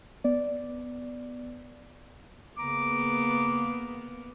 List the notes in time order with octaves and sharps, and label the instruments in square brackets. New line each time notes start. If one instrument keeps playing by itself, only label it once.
[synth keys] B3 D5
[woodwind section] C#3 A#5 D6 [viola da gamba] A#3 B3